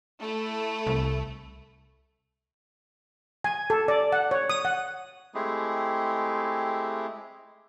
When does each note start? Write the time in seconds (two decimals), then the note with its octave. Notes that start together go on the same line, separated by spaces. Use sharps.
0.20 A3 E4
0.87 C2
3.44 G#5
3.70 A4
3.88 D5
4.12 F#5
4.31 C#5
4.50 D#6
4.65 F#5
5.34 G#3 A3 C4 E4 G4 G#4